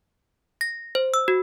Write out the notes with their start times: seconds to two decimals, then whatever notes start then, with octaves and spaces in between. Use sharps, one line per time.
0.61 A#6
0.95 C5
1.14 E6
1.28 F#4